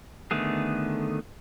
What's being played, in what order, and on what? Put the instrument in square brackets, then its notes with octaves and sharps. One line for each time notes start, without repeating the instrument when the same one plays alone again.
[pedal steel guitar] D3 D#3 A3 B3 G#4